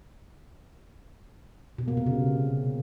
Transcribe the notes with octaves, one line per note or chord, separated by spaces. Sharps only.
B2
A#3
C3
C#3